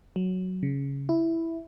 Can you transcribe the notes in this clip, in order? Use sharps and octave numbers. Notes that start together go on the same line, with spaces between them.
F#3
C#3
E4